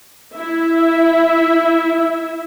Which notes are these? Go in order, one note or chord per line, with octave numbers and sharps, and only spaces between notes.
E4 E5